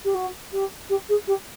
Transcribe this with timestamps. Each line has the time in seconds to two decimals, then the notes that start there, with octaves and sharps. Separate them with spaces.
0.05 G4
0.14 F#4
0.52 G4
0.90 G4
1.09 G#4
1.27 G4